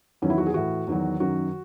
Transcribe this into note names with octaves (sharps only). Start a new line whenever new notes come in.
E2 D#3 F#3 C#4
E4
F#4
G#4
A2 E3 F#4
E2 D#3 F#3
F#2 D#3 F#3 F#4